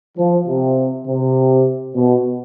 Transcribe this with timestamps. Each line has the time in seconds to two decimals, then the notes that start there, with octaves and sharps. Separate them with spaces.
0.17 F3
0.48 C3
1.06 C3
1.94 B2